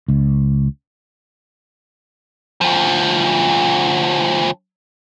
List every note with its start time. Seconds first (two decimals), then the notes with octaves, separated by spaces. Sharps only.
0.08 C#2
2.61 D2 F3